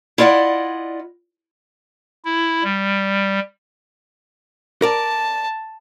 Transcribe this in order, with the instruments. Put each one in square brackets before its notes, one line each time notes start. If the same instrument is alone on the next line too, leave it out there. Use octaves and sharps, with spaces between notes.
[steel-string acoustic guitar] E4 F4 D5 D#5 F#5
[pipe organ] E4
G3
[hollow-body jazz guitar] A#4 D5 [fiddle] A5